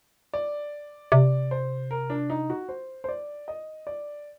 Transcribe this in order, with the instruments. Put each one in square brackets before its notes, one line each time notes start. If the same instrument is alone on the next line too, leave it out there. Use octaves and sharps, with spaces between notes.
[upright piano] D5
[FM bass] C3 [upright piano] D5
[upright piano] C5
A#4
D4
D#4
F#4
C5
C5
D5
D#5
D5